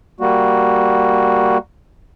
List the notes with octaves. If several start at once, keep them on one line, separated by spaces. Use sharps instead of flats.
G3 A#3 F#4